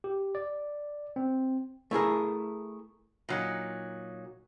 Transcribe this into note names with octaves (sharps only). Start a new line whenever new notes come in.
G4
D5
C4
A3 E4 G#4 A#4
A#2 F#3 D#4